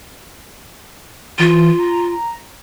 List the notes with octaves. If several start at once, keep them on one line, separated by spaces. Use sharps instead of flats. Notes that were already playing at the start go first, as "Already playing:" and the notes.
E3 F4
A#5